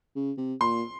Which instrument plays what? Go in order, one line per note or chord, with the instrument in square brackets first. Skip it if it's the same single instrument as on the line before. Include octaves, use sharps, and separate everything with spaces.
[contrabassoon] C#3
C3
[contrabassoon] A#2 [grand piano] C6